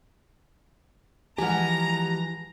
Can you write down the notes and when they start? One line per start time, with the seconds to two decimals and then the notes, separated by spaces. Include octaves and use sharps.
1.38 E3 F3 G#3 G4 F#5 G#5 A#5 F6